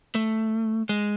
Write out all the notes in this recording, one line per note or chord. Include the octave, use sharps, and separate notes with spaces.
A3
G#3